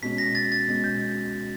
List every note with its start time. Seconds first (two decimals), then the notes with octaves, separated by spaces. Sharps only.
0.03 B2 G#3 C#4 B6
0.18 A#6
0.35 A6
0.52 A6
0.68 B2 G#3 C#4
0.84 G6